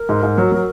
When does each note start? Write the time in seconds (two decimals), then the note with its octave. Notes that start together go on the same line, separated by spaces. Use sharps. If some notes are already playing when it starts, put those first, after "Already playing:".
Already playing: A#4
0.09 G#2
0.23 G#2
0.38 F#3
0.52 F#3